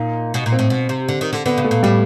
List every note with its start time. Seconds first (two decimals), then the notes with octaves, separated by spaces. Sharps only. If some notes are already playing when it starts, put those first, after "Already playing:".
Already playing: A#2 D#4
0.34 B2
0.46 A#2
0.52 C4
0.59 A2
0.70 B2
0.89 C3
1.08 D3
1.21 D#3
1.33 D3
1.46 D3 B3
1.58 C#3
1.64 A3
1.71 A#2
1.83 A2 G3